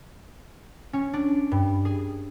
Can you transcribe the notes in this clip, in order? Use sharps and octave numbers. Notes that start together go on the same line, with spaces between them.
C#4
D4
G2
G#4